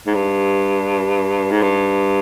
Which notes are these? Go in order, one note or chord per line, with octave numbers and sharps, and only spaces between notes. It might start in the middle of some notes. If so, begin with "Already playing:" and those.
G#2
G2
G#2
G2